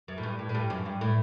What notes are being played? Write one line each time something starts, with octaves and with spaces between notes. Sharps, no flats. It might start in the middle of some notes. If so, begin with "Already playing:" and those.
F#2
A2
G2
A2
A2
G2
F#2
G2
A2